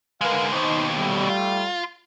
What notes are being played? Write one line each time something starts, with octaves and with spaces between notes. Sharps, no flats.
D3 G#3 A#4 B4 F5
D#2 B2 D#4 C5
G3 A3
F4